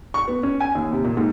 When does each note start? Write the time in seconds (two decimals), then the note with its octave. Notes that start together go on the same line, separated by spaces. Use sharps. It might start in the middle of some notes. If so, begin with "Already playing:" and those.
0.14 C#6
0.28 B3
0.43 C#4
0.60 G#5
0.75 D#2
0.92 C3
1.04 A#2
1.17 G#2